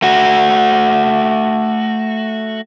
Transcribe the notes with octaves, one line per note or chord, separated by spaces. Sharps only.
A3 F#4